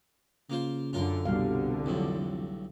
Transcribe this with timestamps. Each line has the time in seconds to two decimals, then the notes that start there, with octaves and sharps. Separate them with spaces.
0.50 C#3 A#3 F4 C5
0.93 F#2 D3 F4 A#4 C6
1.25 C2 B2 D3 G3 F5
1.86 B1 F2 A2